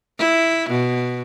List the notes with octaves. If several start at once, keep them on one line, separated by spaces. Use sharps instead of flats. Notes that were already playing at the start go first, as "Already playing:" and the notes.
E4
B2